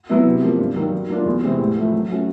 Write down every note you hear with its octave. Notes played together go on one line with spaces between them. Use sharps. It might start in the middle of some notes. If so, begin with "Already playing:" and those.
F#3 B3 E4
C3
F3 A#3
G2
D#3 F#3
D#3
F#3 A#3 D4 F4
E2
C3 E3 G#3 C4
A2
F3 A3
F#3
A3 C#4 F#4